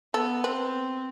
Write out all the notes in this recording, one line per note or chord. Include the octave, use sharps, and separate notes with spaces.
B3 A4
C4 B4